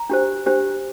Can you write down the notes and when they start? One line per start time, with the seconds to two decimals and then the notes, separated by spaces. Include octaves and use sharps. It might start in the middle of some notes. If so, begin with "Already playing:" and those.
Already playing: A#5
0.10 D4 G4 C5
0.46 D4 G4 C5